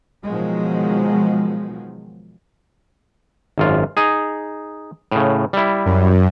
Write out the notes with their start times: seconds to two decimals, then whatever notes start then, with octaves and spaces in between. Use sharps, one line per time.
0.24 B2 D#3 F3 F#3 G#3
3.58 G#1 F#2 F4
3.97 D#4 G#4
5.12 A2 C#3
5.53 G3 E4
5.86 F#2